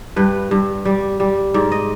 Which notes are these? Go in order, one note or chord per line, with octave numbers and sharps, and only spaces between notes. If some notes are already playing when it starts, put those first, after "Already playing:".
G2 B4
G2
G3
G3
G#2 D5
D#5